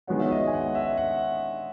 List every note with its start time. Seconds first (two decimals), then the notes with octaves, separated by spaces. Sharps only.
0.07 D#3 G#3 B3 F#4 C#5
0.20 E5
0.31 D#5
0.47 G#5
0.53 F#5
0.75 E5
0.97 F#5